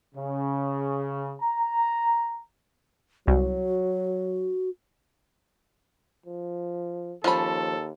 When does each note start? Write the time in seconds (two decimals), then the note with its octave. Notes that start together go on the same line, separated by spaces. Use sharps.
0.15 C#3
1.41 A#5
3.27 C2 F#3 F#4
6.26 F3
7.24 D#2 F3 C#4 A4 B5